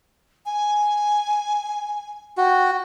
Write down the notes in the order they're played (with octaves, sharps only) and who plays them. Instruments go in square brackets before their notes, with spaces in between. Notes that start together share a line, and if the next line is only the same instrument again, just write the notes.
[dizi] G#5
[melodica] F#4 [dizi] G5